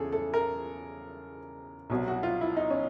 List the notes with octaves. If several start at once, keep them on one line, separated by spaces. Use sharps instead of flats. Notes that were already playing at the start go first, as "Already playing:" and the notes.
Already playing: E2 C#3 G#4 A4
A4
A#4
C2 B2 F#3
F#4
F4
E4
D#4
C#4